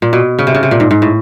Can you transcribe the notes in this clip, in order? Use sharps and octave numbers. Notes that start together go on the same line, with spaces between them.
A#2
B2
C#3
C3
C#3
C3
A#2
G#2
G#2
A2